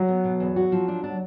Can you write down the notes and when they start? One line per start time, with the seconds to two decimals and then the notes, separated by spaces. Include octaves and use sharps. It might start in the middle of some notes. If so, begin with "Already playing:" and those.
Already playing: F#3
0.08 B3
0.24 B2
0.40 E2
0.56 F#4
0.72 F3
0.88 D4
1.04 D4
1.10 F#3